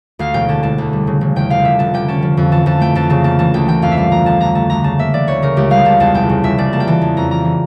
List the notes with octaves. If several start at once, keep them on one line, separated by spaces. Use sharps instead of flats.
D2 F5
E1 G5
D3 A5
E1 A5
D2
G3
C#3
E1
E2 G5
F1 F5
D3 E5
F1 A5
D3 G5
C#4 A5
F3
F2
E3 A5
F2 A5
A3 G5
F2 A5
C#3 A5
A#3 A5
E3 A5
D2 G5
E3 G5
F2 F5
E5
G3 F5
F2 A#5
D3 A5
D2 A#5
A3 A5
D2 A#5
C#3 A5
A#3 E5
E3 D5
D2 C#5
C#3 A#4
C#2 G4
G3 F5
C#2 A5
E2 A5
F1 G5
C#3
F1 E5
C#3 D5
A#3 A5
G5
E3 A5
E2
F2 A#5
A#3 A#5
E3